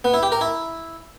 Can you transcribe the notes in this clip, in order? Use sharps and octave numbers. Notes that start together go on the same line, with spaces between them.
B3
E4
G4
A#4
E4